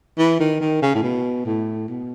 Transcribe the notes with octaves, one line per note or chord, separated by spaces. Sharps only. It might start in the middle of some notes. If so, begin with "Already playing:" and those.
E3
D#3
D#3
C#3
A2
B2
A2
B2